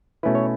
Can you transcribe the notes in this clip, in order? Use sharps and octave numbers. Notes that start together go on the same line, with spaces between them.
B2 A3 C#4 E4 B4
C#5